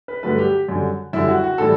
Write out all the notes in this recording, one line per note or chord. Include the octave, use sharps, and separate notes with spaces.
B4
G2 D3 F#3 A3 B4
G4
F#2 D3 G3
F#2 D3 G3 E4
F#4
F#4
A2 E3 G3 A4